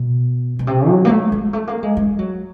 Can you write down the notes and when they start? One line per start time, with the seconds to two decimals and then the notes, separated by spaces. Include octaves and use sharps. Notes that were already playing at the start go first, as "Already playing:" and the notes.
Already playing: B2
0.59 B2
0.67 C3
0.88 F#3
1.05 A#3
1.10 A3
1.32 G#3
1.53 A3
1.68 A#3
1.83 G#3
1.97 G#3
2.19 F#3